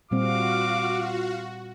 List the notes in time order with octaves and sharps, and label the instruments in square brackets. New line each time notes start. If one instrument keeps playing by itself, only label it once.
[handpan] A#2 G3 C4 [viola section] F4 F5 [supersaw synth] F#4 [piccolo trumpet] D6